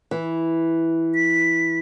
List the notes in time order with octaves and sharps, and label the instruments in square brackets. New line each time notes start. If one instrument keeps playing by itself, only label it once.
[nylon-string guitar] E3
[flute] B6